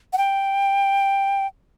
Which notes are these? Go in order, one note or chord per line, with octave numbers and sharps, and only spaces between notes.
F#5
G5